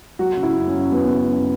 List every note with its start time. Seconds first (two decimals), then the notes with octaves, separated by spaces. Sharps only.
0.19 F#3 F#4
0.37 C#3
0.43 E4
0.55 F#2
0.67 C#4
0.74 F#2
0.91 F#3 B3
1.10 C#3
1.28 F#2